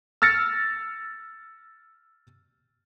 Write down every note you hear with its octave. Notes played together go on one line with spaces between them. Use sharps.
E6 F6 A6 A#6 C#7